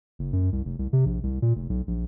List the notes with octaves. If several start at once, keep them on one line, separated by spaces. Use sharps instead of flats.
F#1
F#2
C2
F1
C2
C3
A#1
C2
A#2
F1
B1
A#1